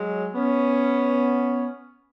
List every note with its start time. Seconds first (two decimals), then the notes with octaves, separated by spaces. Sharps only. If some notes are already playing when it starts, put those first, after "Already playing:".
Already playing: F#3 G#3
0.34 B3 C#4